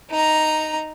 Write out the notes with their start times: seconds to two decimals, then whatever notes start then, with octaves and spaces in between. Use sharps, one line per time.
0.10 D#4 A#5